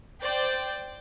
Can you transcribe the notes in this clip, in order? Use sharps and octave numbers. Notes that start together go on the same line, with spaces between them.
C5 D5 G5